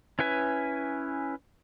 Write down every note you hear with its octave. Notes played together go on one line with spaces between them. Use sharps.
C#4 E4 B4 G#5